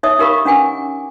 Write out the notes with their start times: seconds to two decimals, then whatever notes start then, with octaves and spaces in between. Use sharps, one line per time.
0.03 D#4 C#5 E5 D#6
0.19 D#4 G4 A#4 F5 B5 C#6
0.45 C#4 D4 F#5 G#5 D6